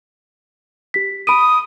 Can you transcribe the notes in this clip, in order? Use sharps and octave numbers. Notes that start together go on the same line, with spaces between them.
G4 B6
B5 D#6 D7 D#7